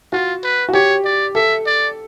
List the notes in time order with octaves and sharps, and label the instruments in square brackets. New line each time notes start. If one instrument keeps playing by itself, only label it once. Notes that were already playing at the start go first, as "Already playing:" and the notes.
[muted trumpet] F4 [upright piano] F#4
[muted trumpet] B4
[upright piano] F#4
[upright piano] G4 [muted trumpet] C#5
[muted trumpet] D5
[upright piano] A4 [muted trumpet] E5
[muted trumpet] D5